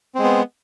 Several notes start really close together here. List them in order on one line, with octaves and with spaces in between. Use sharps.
C4 G#3 B3